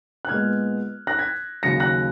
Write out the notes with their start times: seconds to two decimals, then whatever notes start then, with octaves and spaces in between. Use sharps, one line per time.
0.25 F#6
0.29 A#2 G#3 B3 F6 G#6
1.07 F#6 A#6
1.18 G#6 B6
1.63 D#2 C#3 F#3 A#6 C#7
1.80 F#6 A#6